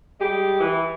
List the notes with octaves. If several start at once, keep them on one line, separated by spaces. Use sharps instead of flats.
G3 G#3 G4
E3